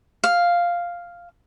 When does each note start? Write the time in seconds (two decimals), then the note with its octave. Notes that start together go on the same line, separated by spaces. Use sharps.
0.24 F5